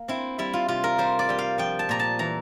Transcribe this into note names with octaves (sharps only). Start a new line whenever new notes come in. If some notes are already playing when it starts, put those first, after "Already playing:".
Already playing: A#3
C4 E4
G3 E4
F4
C3 F4
A#4
G3 C5
D5
G3 G5
F5
F3 G5
A5
A#2 A#5
A5
E3 A#5